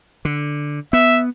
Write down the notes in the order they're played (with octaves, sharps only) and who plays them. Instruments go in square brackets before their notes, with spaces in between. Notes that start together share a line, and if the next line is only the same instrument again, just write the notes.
[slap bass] D3
[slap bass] B3 [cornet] E5